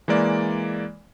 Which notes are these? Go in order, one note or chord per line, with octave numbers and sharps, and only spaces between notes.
E3 G#3 A#3 D5